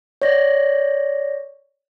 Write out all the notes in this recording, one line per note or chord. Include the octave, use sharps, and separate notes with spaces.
C#5 D5 A#6